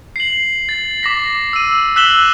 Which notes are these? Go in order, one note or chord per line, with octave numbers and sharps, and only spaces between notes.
C7 F#7
A6
D6 A#6 B6
E6 D#7
E6 F#6 B6 E7 F#7 G7